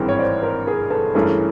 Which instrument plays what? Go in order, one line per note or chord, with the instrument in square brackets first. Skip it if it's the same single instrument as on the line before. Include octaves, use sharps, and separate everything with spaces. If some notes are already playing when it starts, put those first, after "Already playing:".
Already playing: [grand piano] G#1 G2 E3 G#3 C4 [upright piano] A#4
[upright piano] C#5
C5 D5
A#4 C5
G#4 A#4
A4 B4
[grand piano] G2 E3 A3 C#4 [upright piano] G#4 A#4